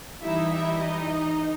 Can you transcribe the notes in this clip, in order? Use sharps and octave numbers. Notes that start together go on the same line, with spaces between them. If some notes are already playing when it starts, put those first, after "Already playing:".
E3 G3 D#4 E4 E5
E4 E5
D#4 D#5